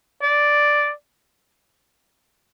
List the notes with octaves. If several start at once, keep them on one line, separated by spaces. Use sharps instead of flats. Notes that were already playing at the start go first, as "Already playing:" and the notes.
D5